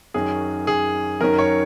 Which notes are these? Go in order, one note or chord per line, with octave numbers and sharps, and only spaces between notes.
F#2 D#3 F#3 C#4 G#4
G#4
F#2 D#3 F#3 C#4 A#4
C#5